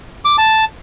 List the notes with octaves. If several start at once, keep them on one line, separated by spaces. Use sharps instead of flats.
D6
A5